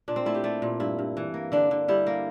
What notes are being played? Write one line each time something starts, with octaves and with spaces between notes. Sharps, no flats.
A#2 D4
C4
A3 E4
G4
A3 D5
A#2
G2 E4
G2
E3
A#3
D3 D4
D3
G3 E4
A#3